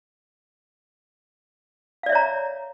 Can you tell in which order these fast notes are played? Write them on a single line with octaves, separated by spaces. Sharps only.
F5 D5 E5 C#5 A#5